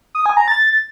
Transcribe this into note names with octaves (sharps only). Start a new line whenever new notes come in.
D#6
G#5
A#5
A6